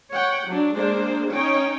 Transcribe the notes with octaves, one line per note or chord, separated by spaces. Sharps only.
C#5 F#5 G5
F#3 D4
G#3 A#3 D4 C5
C#4 D#4 C#5 G5